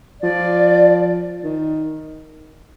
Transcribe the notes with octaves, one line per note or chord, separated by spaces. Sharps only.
F3 D5
D#3